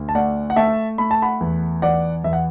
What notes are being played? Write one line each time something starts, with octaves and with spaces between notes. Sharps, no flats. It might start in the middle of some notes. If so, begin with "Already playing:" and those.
Already playing: D2
A5
A3 D5 F#5
F#5
A3 E5 A5
A3 B5
A5
F#5 B5
E2
E2 D5 F#5
E2 E5
F#5